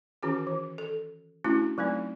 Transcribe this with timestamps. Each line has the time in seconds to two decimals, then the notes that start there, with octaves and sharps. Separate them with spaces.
0.23 D#3 E3 C#4 F#4 G#4
0.47 E3
0.78 A4
1.44 A3 C#4 D4 E4 F#4
1.78 F#3 A3 C4 D#4